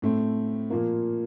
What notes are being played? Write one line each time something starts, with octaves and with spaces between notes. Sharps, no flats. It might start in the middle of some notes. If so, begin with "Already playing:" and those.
A2 A3 C4
A#2 F3 A#3